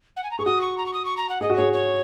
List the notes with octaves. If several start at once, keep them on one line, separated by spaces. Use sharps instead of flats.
F#5
G#5
A#5
G#4 C#6
F#4 D#6
C#6
A#5
C#6
D#6
C#6
A#5
F#5
G#4 D#5
F#4
G#4 C#5
C#5